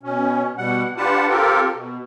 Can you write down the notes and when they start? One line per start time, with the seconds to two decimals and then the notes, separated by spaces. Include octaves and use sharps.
0.03 B2 C#4
0.58 B2 G3 F#5
0.97 D4 F4 G4 B4 F#5 A5
1.29 C4 F4 G4 A4 A#4
1.75 B2